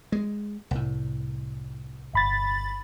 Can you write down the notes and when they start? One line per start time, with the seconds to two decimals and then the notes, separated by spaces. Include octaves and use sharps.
0.12 G#3
0.71 C2 A2
2.14 G1 B5 A6